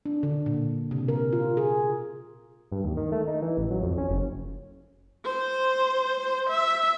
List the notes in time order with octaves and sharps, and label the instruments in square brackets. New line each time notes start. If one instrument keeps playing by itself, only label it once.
[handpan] D4
D3
A#2
C3
A#4
F4
G#4
[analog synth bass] G2
D#2
D#3
A3
D#4
E3
A1
F#3
F2
C#4
F#1
[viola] C5
E5